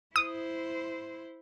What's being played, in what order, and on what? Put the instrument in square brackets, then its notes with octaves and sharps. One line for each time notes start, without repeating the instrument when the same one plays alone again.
[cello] E4 C5 [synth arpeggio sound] D#6